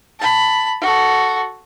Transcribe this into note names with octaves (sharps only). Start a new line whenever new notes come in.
A5 B5
F#4 A4